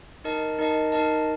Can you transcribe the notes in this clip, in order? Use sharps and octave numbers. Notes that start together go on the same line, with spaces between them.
D#4 A#4 D#5 A5
D#4 A#4 D#5 A5
D#4 A#4 D#5 A5